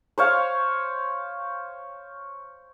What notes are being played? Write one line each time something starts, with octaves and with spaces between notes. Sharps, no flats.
C5 C#5 F5